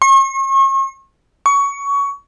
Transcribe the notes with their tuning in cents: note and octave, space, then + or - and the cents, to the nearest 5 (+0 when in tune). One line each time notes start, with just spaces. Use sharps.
C#6 -40
C#6 +20